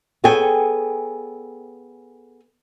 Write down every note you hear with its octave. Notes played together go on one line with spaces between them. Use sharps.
B3 G#4 A4 C#5 G5 G#5